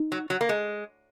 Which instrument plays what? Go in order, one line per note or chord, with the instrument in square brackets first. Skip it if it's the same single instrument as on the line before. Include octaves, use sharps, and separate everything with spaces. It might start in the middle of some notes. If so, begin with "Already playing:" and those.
Already playing: [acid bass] D#4
[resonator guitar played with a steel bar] F#3
F#3
A#3
G#3